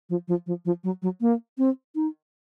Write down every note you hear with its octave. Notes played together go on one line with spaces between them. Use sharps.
F3
F3
F3
F3
F#3
F#3
A#3
C4
D#4